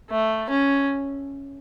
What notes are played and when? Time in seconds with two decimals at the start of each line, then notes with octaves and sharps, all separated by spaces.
0.10 A3
0.50 C#4